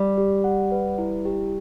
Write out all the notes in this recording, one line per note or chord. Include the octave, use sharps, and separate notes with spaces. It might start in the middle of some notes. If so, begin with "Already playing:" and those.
Already playing: G3
G4
F#5
B4
E4
G4